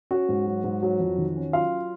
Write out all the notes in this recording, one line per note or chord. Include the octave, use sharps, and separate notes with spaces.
C#4 F#4 F#5
G#2
F#3
G#2
F#3
F2
D#3
C#4
F#3 F4 F5